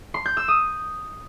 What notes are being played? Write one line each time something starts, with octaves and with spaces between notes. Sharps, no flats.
C6
G6
E6
D#6